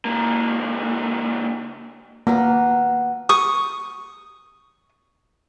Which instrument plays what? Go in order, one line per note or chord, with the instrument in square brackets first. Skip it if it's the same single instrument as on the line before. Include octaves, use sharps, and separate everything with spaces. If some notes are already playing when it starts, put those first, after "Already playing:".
[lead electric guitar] C#2 A#3
[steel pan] A#3 [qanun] B3 F#4 C6
[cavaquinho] C#6 D#6